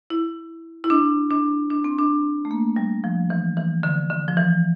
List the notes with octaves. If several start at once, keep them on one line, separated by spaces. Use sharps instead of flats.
E4
E4
D4
D4
D4
C4
D4
A3
A#3
G3
F3
E3
E3
D3
D3
F3
E3